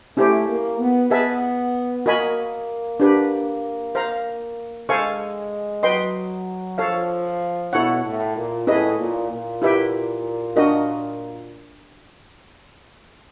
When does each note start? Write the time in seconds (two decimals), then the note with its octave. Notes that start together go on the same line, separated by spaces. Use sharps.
0.17 A3 C#4 E4 G4 C5
0.47 A#3
0.80 B3
1.11 B3 G#4 B4 E5 A5
2.05 A#3 F#4 A#4 D#5 G#5 B5
3.00 D4 G4 B4
3.95 C5 F5 A#5
4.88 G#3 A4 C5 F5 G#5 C#6
5.83 F#3 B4 D#5 G5 C6
6.78 F3 A4 C#5 F5
7.72 B2 E4 A4 C#5 F#5
8.04 A2
8.36 A#2
8.67 A2 C#4 E4 G#4 B4 D#5
8.99 A#2
9.30 A#2
9.62 E4 G4 B4 E5 G5
10.56 D4 F#4 A#4 D#5